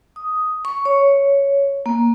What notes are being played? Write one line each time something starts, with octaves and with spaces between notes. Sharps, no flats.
D#6
C#6
C#5
A#3